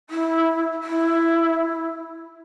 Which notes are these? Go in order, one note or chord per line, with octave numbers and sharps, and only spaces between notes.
E4
E4